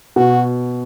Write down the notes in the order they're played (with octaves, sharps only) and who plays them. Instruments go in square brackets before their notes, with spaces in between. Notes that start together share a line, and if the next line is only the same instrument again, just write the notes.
[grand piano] B2 [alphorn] F#4